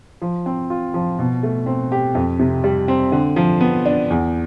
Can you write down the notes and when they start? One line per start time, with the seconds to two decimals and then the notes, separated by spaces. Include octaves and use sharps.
0.22 F3
0.46 C4
0.70 F4
0.94 F3
1.19 B2
1.43 A3
1.66 C4
1.92 G4
2.15 F2
2.40 C3
2.64 G3
2.88 C4
3.12 D3
3.36 F3
3.61 B3
3.86 D4
4.10 E2